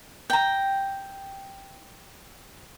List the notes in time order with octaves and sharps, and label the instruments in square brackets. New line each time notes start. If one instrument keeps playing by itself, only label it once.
[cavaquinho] G5 A#5